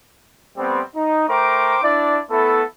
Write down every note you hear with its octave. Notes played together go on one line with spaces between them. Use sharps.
G3 A3 B3 C4
D#4
A3 A#4 C5 G5 A#5 D6
D4 E4 D5
A3 B3 E4 A4